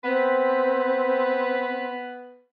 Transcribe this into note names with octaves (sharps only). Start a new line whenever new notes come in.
B3 C4 B4